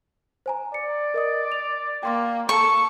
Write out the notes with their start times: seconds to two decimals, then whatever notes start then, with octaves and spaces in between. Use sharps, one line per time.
0.46 C5 G#5 A#5
0.74 D5 C#7
1.14 A#4 D#5 D#6
1.52 F7
2.03 A#3 G5 C6 D6
2.49 A4 A#5 C#6